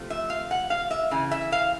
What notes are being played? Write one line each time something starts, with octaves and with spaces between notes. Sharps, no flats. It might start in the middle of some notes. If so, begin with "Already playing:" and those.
Already playing: C3 F3 A3
E5
F5
F#5
F5
E5
C#3 E3
E5
F5